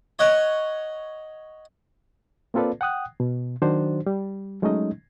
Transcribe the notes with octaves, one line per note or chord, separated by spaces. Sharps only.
C#5 D#5 F#5
A#3 C4 F4 A4 B4 D5
F#5 G5 D#6 F#6
B2
D#3 F#3 D4 F#4 C5
G3
F#3 G#3 A3 C#4 D#4 D#5